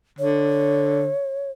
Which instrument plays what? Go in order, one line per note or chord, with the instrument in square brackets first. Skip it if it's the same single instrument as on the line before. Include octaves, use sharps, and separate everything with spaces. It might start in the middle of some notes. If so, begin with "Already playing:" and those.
[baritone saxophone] D3 [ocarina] C#5